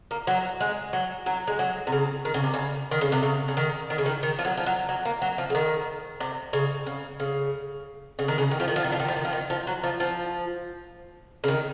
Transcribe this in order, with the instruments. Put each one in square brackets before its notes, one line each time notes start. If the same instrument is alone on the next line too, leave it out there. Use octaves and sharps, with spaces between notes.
[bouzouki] A#3
F#3
G#3
F#3
F#3
G#3
F#3
C3
C#3
D#3
C#3
C3
C#3
D#3
C#3
C3
C#3
C#3
D#3
D#3
C#3
D#3
D#3
F3
F#3
F3
F#3
F#3
A#3
F#3
F3
C#3
D#3
C3
C#3
C#3
C#3
C#3
D#3
C#3
D#3
F3
D#3
F3
D#3
F3
D#3
F3
D#3
F3
D#3
F3
F#3
F3
F3
C#3
D#3